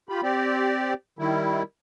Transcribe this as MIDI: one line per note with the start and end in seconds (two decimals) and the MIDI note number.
0.09 0.22 65
0.09 0.22 67
0.09 0.22 83
0.23 0.94 60
0.23 0.94 67
0.23 0.94 74
1.19 1.63 51
1.19 1.63 55
1.19 1.63 64